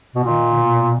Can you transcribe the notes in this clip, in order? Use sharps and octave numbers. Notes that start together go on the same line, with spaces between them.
B2
A#2 D#3
B2